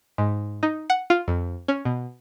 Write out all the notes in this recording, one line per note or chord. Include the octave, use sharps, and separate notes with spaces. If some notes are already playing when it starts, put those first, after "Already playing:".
G#2
D#4
F#5
F4
F2
C#4
B2